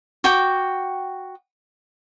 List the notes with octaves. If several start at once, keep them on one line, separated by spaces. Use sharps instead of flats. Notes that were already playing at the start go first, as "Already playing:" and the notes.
F#4 G5 D6